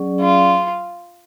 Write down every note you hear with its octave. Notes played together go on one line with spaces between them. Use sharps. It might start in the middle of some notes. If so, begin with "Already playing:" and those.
Already playing: F#3 C#4 G#4 D5
F4